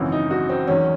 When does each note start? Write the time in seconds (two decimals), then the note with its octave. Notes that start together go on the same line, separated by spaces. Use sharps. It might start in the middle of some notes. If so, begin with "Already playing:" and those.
Already playing: G#1 F#2 C#3 E3
0.12 D#4
0.31 F#4
0.49 C4
0.67 E1 E2 D#3 F#3 C#4